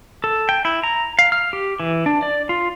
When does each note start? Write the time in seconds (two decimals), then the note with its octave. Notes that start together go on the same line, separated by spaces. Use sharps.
0.24 A4
0.49 G5
0.65 E4
0.84 A#5
1.19 F5
1.32 F6
1.53 G4
1.80 E3
2.06 D4
2.22 D5
2.49 F4